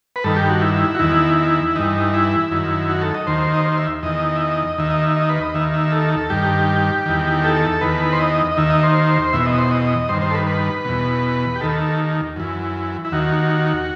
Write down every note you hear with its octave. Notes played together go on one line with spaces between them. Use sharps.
B4
G2 D#3 A4
G4
F#4
E4
F#4
E2 D#3 E4
E4
G2 E3 D#4
E4
F#2 D#3
F#4
A4
D#5
D#2 D#3 C5
D#5
C5
E5
E2 D#3 D#5
E5
D#5
D#2 D#3 E5
D#5
E5
D#5
B4
D#5
D#2 D#3 E5
E5
A4
G2 D#3 G4
E2 D#3
A4
E2 D#3 B4
C5
D#5
D#5
D#2 D#3 E5
D#5
C5
E2 B2 E5
D#5
C5
D#5
G2 D#3 C5
C5
A4
B4
B4
E2 B2
G4
D#2 D#3 A4
F#2 E3
E4
D#2 D#3 F#4